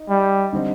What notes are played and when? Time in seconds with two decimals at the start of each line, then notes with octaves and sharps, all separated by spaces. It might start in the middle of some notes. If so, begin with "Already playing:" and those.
Already playing: D#4
0.09 G3
0.52 D3 G3 C4 D#4